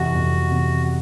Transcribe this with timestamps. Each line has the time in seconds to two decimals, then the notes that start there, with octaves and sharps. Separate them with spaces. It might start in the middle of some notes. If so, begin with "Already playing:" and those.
Already playing: F2 C3 E3 F#4
0.15 F2
0.51 C3 E3